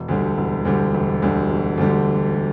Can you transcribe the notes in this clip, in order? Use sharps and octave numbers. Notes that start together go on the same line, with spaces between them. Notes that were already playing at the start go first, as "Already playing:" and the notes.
Already playing: E1
D2 D3 G3
E1
D2 D3 G3
E1
D2 D3 G3
E1
D2 D3 G3